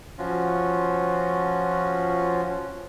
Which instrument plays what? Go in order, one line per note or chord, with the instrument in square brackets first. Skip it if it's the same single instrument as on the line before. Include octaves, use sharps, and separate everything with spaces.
[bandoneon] F3 C#4 F4 F#4